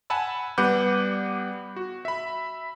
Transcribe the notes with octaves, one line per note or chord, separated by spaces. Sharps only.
F#5 G#5 A5 B5 E6
G3 B3 B4 F#5 D6 G6
F#4
E5 B5